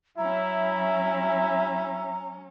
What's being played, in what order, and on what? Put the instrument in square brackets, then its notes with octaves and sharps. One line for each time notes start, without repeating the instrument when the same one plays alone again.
[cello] F#3 C#4 [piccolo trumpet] E4 [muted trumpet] E5 [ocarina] A#5